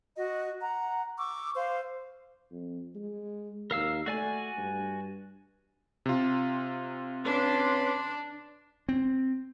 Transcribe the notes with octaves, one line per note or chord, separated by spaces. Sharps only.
F#4 D#5
F#5 A#5
C#6 D6 E6
C5 F5
F2
G#3
D#2 A#4 F5 E6
A3 F#4 D5 G#5
G2
C3 F4
C#4 D4 B4 C6
C4